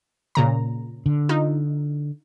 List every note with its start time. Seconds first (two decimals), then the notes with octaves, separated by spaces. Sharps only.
0.35 A#2 C#3 A#5
1.06 D3
1.29 D#4 F4